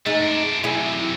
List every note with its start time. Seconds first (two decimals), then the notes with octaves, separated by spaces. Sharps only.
0.06 G#3 A3 D#4
0.20 F#2 D4
0.64 F#2 C3 E4 G#4